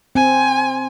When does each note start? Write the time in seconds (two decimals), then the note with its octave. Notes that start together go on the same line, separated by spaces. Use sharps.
0.15 C4 G#5